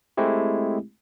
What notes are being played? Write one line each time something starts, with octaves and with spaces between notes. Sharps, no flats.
G#3 A3 C4 E4 G4